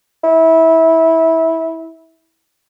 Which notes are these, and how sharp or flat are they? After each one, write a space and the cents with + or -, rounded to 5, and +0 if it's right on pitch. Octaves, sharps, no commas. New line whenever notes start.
E4 -20